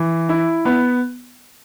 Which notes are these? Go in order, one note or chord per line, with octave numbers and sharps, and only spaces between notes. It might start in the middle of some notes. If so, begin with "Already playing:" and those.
Already playing: E3
E4
B3